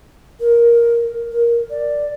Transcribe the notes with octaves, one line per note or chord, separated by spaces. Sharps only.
A#4
A#4
D5